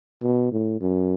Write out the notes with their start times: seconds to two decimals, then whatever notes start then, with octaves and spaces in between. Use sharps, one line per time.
0.22 B2
0.52 A2
0.81 F#2